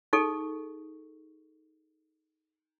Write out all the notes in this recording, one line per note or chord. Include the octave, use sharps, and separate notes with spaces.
D#4 G#4 A4 C#6